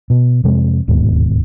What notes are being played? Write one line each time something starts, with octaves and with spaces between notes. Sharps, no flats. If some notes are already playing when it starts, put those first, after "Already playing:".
B2
F2 C3 G#3
D1 D#2 G#2 B2